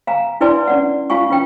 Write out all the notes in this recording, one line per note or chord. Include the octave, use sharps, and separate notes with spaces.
F5 G#5 A#5
D4 E4 B4 D5 G#5 C6
C#4 D5 F#5
F4 F5 G#5 C#6
C#4 F4 B4 G5